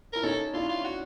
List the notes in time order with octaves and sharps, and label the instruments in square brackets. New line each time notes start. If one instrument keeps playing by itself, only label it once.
[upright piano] E4 [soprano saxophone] A#4
[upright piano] C#4 D#4 [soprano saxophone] A4
[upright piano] D4 E4 [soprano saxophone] F4
[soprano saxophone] F4
F#4